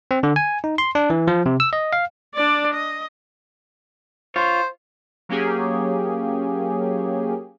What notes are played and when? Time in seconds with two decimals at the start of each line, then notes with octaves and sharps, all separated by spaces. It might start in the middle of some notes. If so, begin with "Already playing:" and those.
0.11 C4
0.23 D3
0.36 G#5
0.64 D#4
0.78 C6
0.95 D4
1.10 E3
1.28 F3
1.46 C3
1.60 E6
1.73 D#5
1.93 F5
2.35 D4 D5
2.74 D#5
4.36 F4 C5 C#5
5.29 F#3 A#3 C#4 G4 G#4